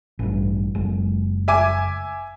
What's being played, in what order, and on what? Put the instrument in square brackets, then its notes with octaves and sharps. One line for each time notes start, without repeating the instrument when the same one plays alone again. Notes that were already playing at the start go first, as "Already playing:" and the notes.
[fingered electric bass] A1 G2
F#1 G#3
[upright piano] E5 G#5 D6